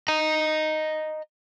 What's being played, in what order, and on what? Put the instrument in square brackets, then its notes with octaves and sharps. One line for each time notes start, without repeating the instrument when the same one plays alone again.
[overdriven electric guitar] D#5 A#5